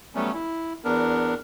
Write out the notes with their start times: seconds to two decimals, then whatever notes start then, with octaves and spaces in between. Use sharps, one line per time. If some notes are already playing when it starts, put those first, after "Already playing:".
0.15 F#3 G3 A3 B3 C#4
0.34 E4
0.85 E2 B3 D4 A#4